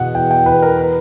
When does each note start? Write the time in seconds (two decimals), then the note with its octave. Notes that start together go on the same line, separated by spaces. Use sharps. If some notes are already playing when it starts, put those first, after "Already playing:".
Already playing: E2 B2 F#5
0.15 E2 G5
0.31 G5
0.46 E2 B4
0.62 A#4
0.78 B4